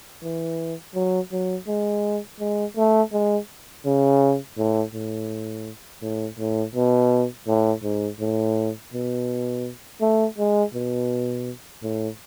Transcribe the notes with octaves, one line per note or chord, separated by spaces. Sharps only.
E3
F#3
F#3
G#3
G#3
A3
G#3
C#3
A2
A2
A2
A2
B2
A2
G#2
A2
B2
A3
G#3
B2
A2